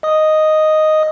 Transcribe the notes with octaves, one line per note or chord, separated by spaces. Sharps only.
D#5 D#6